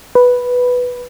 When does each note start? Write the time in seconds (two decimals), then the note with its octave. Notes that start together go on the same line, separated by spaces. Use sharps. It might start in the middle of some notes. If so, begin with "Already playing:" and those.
0.15 B4